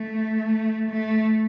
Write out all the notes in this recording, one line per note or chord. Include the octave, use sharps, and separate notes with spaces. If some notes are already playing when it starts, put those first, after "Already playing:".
Already playing: A3
A3